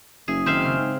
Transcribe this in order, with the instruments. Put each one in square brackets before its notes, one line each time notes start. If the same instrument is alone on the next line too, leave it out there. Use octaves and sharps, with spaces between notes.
[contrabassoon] F#1 [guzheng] G#4 [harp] E5
[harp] D#3 G6 [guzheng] C4 E5 F5
[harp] C#3 F6
[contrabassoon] G#2